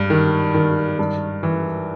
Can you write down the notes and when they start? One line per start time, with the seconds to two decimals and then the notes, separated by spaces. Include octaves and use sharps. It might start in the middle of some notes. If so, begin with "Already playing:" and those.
Already playing: G2
0.10 D#3
0.54 D#3
0.99 G2
1.43 E3